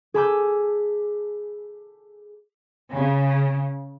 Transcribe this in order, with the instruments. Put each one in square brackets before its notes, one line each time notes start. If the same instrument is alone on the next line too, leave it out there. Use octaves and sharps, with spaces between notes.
[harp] G#4 A5 B5 D6 E6 G6
[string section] C#3